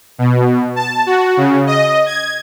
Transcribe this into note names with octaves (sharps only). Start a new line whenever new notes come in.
B2
A5
F#4
C#3
D#5
G#6